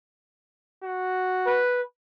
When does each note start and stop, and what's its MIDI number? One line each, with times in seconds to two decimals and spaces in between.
0.84 1.61 66
1.46 1.82 71